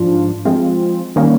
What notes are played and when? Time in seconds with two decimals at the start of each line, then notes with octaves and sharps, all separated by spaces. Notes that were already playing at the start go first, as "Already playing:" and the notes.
Already playing: G#2 F3 D4 F4
0.45 F3 G#3 C4 F4
1.16 D#3 G3 A#3 C#4